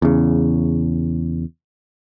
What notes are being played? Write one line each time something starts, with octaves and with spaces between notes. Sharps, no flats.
E2 C#3